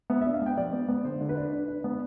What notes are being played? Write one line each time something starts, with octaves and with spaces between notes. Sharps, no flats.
B3 E5
E5
D4
F5
B3 G5
F3 D5
B3
B3
D3 C5
D3
B4
D4
D4
D4
B3